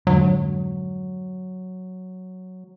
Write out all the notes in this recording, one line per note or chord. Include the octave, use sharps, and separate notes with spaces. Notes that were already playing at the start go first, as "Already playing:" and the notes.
F2 G#2 D3 F#3